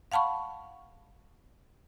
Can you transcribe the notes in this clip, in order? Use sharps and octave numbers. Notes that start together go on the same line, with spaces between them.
F5 F#5 A5 B5 C#6